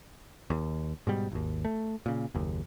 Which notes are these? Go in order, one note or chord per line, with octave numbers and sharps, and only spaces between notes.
D#2
G#2 B2 G3
G#1 D#2
A3
A#2 C#3
F#1 D#2